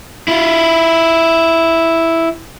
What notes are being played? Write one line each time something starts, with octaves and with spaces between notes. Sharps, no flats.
E4 F4